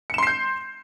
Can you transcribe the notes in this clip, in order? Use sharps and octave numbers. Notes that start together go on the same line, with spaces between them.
C6 G6 C7 C#7 E7